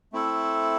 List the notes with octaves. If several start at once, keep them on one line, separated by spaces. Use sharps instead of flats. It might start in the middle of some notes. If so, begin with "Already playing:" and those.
A3 C4 E4 A4